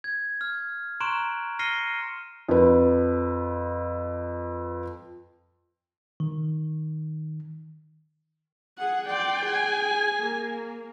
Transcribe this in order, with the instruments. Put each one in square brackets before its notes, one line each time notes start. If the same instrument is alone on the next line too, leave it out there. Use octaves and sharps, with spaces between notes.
[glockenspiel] G#6
F6
A#5 C6 C#6 F#6 D7 E7
F6 A#6 C7 C#7 D#7 G7
[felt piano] F2 B4
[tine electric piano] D#3
[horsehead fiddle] G#4 F#5
[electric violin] D5 C6 [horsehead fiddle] G5
[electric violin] G#4 G#5
[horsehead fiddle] A#3